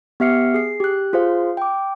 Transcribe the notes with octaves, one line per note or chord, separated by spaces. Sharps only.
B3 G4 E5 F6 C7 C#7
G#4 C7
G4 F#6
F4 G#4 C5 F5
G5 D6